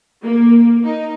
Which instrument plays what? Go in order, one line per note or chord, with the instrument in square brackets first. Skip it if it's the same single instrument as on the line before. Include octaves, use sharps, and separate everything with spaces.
[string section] A#3
D#4